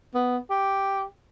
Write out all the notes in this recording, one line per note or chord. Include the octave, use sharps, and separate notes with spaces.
B3
G4